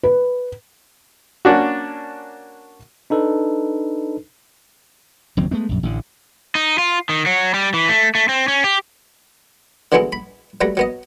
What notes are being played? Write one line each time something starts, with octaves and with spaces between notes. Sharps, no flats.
B4
A#3 C#4 D4 F#4
D4 D#4 A4 B4
F#1 D#2 F#3 C4
G#3 A3 B3 D4
A#1 F#2
A1 D3
D#4
F4
D#3
F#3
G3
E3
A3
A3
C4
C#4
G4
D3 E3 F#3 G#3 B3 E4
B5
F#3 G3 A3 B4 A#5
F#3 B3 D#5